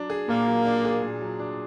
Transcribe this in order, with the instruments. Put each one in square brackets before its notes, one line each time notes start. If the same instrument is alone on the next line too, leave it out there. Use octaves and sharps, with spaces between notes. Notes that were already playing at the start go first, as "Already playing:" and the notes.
Already playing: [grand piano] F#3 D4
G#4
[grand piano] A#2 [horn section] A#3
[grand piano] F#3
D4
G#4
A#2
F#3
D4